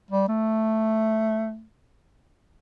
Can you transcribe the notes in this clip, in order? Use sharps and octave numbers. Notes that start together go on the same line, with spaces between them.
G3
A3